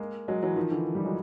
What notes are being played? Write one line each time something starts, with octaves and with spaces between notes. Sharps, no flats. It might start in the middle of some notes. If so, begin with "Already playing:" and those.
Already playing: G#3 A#3
F#3 G#3
E3 F#3
D#3 F3
D3 E3
F3 G3
F#3 G#3